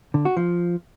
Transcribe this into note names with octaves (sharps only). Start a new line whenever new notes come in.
D3
F#4
F3